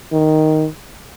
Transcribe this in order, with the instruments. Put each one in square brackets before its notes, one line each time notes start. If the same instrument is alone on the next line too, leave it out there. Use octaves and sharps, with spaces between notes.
[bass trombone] D#3